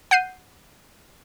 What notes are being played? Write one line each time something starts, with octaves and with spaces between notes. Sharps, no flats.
F#5 G6 C7 D#7